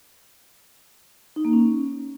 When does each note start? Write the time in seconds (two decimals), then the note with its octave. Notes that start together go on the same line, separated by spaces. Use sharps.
1.36 D#4
1.45 A#3
1.53 C#4